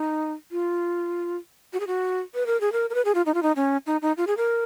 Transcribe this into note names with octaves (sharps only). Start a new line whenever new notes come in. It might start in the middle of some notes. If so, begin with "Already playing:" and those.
Already playing: D#4
F4
F#4
G#4
F#4
B4
A#4
G#4
A#4
A#4
B4
G#4
F4
D#4
F4
D#4
C#4
D#4
D#4
F4
G#4
A#4